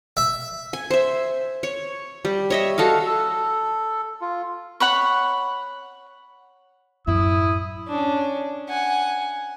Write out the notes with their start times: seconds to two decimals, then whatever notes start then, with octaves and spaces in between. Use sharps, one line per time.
0.17 E5
0.73 G#5
0.90 C5 E5
1.63 C#5
2.25 G3
2.50 C#5 D#5 E5
2.78 F#4 A4 D#5 F5
3.06 A4
4.21 F4
4.80 C#5 F#5 B5 C#6
7.07 F#2 A2 E4 D#6
7.88 C#4 D4
8.69 F#5 G#5